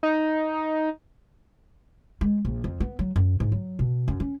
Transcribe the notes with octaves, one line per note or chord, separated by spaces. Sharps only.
D#4
G#3
A#1
F2
B3
F#3
F#2
G#2
F#3
B2
F#2
C#4